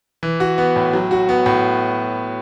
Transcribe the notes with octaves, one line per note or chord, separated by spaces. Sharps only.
E3
F#4
B3
A2
F#3
F#4
B3
A2